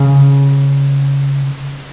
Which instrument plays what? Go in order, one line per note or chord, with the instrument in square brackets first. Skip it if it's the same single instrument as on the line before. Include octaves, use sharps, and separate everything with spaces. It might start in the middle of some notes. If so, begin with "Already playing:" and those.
Already playing: [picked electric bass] C#3